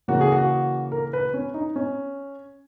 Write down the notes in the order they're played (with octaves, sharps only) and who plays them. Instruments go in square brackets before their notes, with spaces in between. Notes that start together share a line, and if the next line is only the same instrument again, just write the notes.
[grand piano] C#3 E3 A#3 F#4
G#4
F#4
A#4
B4
C#4
D#4
C#4